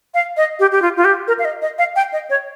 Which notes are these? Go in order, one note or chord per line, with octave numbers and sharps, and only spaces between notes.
F5
D#5
G4
G4
F4
F4
G4
A#4
F5
D#5
D#5
F5
G5
D#5
C#5